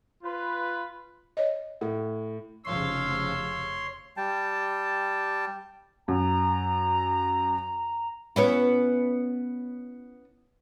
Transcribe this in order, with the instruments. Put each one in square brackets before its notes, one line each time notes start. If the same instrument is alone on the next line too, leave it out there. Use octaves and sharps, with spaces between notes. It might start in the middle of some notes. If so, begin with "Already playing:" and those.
[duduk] F4 [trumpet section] B4
[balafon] C#5 D#5
[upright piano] A2 [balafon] F#5
[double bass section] F1 C#3 F3 [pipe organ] C#5 C6 [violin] F5 E6
[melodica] G3 G5 A5
[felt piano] F#2 [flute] A#5
[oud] B3 C#4 E4